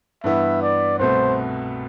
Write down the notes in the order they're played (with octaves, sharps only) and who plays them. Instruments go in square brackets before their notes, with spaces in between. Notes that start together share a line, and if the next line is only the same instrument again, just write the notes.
[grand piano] G2 E3 B3 [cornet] E5
[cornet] D5
[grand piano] C2 B2 A3 [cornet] C5